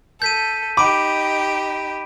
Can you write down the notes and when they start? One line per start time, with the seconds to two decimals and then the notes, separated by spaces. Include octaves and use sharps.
0.22 A4 G6 B6 D#7
0.77 D#4 G4 B5 D6 D7